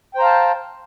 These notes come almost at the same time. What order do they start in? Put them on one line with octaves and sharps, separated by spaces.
G5 C5 A#5 F5 A5